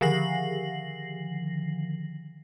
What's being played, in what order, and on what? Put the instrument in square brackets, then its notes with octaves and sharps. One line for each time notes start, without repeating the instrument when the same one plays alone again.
[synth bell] D3 D#3 F3 A#6 C7 F#7